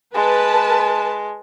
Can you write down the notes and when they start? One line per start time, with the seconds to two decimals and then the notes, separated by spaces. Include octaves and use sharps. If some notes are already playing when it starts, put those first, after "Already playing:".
0.14 G#3 B4 A5